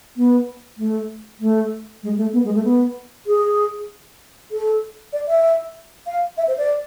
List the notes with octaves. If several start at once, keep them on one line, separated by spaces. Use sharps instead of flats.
B3
A3
A3
G#3
A3
B3
G#3
A3
B3
G#4
A4
D5
E5
F5
E5
C5
D5